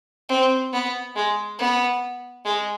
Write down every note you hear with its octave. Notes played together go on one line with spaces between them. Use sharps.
C4
B3
G#3
B3
G#3